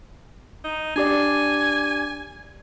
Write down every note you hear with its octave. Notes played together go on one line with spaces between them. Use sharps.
D#4
D4 G4 D5 G#5